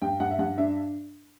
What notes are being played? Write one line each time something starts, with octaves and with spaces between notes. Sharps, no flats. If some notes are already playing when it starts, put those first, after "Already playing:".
G2 G5
G2 F#5
E5
G2 F#5
D4 E5